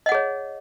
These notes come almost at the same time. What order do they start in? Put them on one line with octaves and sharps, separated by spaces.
D#5 F#5 G#4 C#5